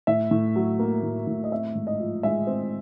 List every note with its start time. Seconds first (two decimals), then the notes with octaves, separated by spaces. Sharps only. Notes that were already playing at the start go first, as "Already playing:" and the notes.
0.07 A2 E5
0.31 A2
0.56 F#3
0.79 A#3
1.03 A2
1.27 A2
1.44 D#5
1.51 C4 E5
1.75 G#2
1.87 D#5
1.99 F3
2.23 G#3 E5
2.47 C4